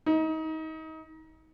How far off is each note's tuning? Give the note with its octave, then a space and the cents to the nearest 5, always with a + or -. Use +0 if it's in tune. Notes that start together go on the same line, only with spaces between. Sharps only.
D#4 +30